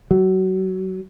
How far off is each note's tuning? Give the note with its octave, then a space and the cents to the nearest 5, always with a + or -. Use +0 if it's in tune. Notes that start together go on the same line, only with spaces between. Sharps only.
F#3 +25